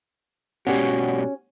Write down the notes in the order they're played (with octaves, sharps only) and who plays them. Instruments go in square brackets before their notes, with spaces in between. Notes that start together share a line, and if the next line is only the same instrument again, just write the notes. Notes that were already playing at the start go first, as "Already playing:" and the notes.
[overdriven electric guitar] G#2 B2 [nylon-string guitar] C#4 [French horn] F#4 [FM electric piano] G4 D5 F#5